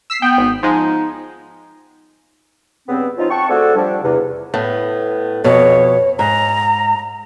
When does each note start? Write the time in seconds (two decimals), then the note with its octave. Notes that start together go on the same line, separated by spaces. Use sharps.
0.10 E6 B6 C7
0.22 B3 G5
0.38 G#1
0.63 F3 G#3 D#4
2.89 G2 C#3 B3 C4
3.18 F3 C#4 D#4 F4
3.30 F#5 G5 A5 C#6
3.49 A3 C4 F#4 G#4 A4 D5
3.76 F3 G3 D4
4.03 E2 C3
4.54 A2 B3
5.44 F2 B2 C#5
6.19 G#2 A#5